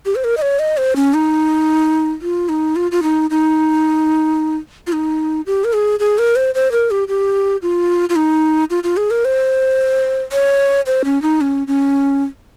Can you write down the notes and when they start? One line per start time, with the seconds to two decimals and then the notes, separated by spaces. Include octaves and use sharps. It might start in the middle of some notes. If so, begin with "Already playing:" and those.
0.06 G4
0.16 C5
0.24 A#4
0.37 D#5
0.42 C#5
0.59 D#5
0.77 C5
0.96 C#4
1.14 D#4
2.22 F4
2.49 D#4
2.76 F4
2.92 F4
3.03 D#4
3.30 D#4
4.87 F4
4.93 D#4
5.46 G4
5.64 A#4
5.73 G#4
6.00 G#4
6.18 A#4
6.36 C5
6.55 C5
6.72 A#4
6.91 G4
7.08 G4
7.62 F4
8.09 F4
8.16 D#4
8.70 F4
8.84 F4
8.97 G#4
9.11 A#4
9.25 C5
10.32 C#5
10.86 C5
11.05 C#4
11.22 D#4
11.41 C#4
11.67 C#4